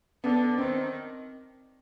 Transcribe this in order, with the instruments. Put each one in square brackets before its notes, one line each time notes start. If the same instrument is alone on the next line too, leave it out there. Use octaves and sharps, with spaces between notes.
[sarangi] D3 [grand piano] B3
[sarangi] D#3 [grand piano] C4